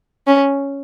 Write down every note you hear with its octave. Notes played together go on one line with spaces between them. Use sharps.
C#4